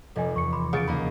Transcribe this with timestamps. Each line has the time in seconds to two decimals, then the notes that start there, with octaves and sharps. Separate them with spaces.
0.16 F1 A4 D#5 G#5
0.36 E2 C#6 C#7
0.53 B5 C6 D6
0.73 C#3 F#5 A6 D7
0.88 D#2 A#3 D#5 B5